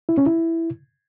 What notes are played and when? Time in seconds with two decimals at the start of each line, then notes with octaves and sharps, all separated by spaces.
0.09 E4
0.18 C#4
0.26 E4